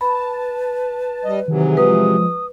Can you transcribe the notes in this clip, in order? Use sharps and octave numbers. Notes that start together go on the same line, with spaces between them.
B4 A5 B5
G3 D#5
C3 D#3 E3 F#3 G#4
F3 G#3 B4 D#6